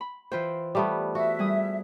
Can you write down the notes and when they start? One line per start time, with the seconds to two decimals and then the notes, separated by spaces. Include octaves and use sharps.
0.01 B5
0.32 E3 F4 B4 C5 G5
0.75 G3 A3 B3
1.15 F#4 E5
1.39 G3 G#4 D#6